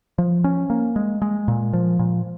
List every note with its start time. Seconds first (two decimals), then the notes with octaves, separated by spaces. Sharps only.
0.18 F3
0.44 C#4
0.70 A#3
0.96 G#3
1.22 G#3
1.48 A#2
1.73 F3
1.99 A#2